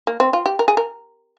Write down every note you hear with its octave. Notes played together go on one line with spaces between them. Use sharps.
A#3
C4
F4
G4
A#4
G#4
A#4